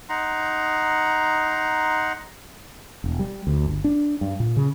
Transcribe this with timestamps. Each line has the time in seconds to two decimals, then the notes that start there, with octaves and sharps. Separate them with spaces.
0.09 D#4 F#5 A#5 C6
3.04 E1
3.19 G3
3.47 D2
3.66 G1
3.84 D4
4.21 G2
4.40 A#2
4.57 C#3